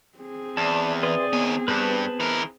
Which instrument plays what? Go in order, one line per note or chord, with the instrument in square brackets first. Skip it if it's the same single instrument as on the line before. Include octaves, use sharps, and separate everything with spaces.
[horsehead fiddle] C4 G#4
[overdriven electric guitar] E2 [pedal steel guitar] D5 A5
[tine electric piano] B4 E5 A6 [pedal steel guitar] D5 C6 D#6
[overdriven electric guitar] D#2 G#5 [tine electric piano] B3
[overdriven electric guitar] G2 [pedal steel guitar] B4 C5 A5
[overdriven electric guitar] E3 A#4